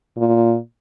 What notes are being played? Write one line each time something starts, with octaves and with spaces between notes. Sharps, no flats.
A#2